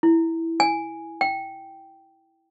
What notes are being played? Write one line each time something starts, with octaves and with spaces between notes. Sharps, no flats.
E4
G#5
G5